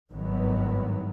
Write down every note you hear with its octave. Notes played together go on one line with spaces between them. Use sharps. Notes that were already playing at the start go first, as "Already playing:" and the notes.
G#1 G2 D#3 E3 F#3 B3